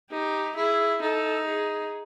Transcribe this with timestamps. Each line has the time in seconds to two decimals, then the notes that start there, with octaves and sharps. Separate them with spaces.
0.11 D#4 G4
0.56 E4 G#4
1.01 D#4 A4
1.46 G#4